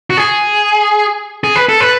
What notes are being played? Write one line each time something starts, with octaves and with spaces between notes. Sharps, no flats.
F#4
G#4
G#4
B4
A4
B4